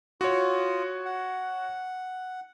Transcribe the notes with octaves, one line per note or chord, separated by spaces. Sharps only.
F4 F#4 C#5 D#6
F#5